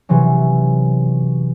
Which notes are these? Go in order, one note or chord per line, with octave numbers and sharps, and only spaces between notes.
C3 E3 F#3 C#4